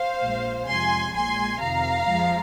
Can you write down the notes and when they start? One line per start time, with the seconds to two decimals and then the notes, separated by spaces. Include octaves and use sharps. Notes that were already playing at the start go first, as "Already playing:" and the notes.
Already playing: C5 F5
0.23 A#1 A#2 G#3
0.68 F2 C3 F3 G#3 G#5 C6
1.14 A#1 A#2 G#3 G#5 C6
1.60 F2 C3 D#3 F5 A#5
2.07 F2 F3 G#3